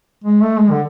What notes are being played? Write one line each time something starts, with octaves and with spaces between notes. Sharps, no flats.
G#3
A3
G#3
D3